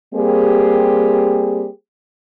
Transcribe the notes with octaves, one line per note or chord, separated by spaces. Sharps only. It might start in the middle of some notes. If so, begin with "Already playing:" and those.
G3 A#3 C4 G4 G#4